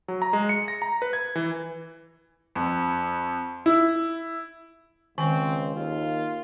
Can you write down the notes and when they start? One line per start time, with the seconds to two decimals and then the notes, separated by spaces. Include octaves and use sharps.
0.08 F#3
0.22 A#5
0.33 G#3
0.49 C#7
0.68 A#6
0.82 A#5
1.02 B4
1.13 G#6
1.35 E3
2.55 F2
3.66 E4
5.18 C#2 D#3 C4 G#5
5.76 D#2 F4